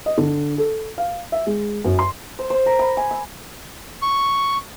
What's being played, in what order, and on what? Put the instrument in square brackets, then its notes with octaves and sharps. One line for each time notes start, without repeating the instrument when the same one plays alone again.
[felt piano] D#5
D3
A4
F5
E5
G#3
F#2
C6
[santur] C5
C5
A#4
B5
G#5
E6
[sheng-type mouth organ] C#6